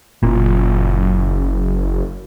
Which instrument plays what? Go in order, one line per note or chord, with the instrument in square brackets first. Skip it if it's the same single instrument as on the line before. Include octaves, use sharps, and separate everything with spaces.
[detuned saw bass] F#1 [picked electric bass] A#2